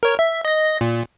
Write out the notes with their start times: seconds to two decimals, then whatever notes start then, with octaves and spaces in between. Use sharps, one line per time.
0.03 A#4 C#5
0.19 E5
0.45 D#5 A#6
0.81 A#2